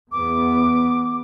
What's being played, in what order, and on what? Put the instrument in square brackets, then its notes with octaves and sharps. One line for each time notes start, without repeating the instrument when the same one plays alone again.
[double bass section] E2 B3 [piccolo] D6